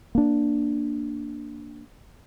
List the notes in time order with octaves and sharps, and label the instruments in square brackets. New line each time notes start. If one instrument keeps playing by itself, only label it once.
[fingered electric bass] A#3 D4